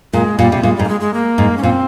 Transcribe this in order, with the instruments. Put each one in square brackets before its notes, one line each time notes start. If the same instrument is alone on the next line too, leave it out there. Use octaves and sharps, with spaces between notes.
[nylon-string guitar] A#2 [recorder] G#3
[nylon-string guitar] A#2 [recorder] G3
[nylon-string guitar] C3
[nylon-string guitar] A#2 [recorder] G#3
[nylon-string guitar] G#2 [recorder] G3
[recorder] A#3
G#3
G#3
A#3
[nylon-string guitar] G#2
[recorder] C#4
[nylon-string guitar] A#2 [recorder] C4